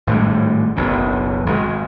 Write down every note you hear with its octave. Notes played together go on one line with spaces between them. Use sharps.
G#1 A2 G3 G#3
F#1 B1 C#3
G#1 G#3